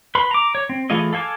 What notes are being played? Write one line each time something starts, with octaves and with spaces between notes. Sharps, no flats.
B4 B5 C6
A#5 D6
C#5
C4
E3 A3 F4 G#4 D#5
A4 F5 G#5 A5 D6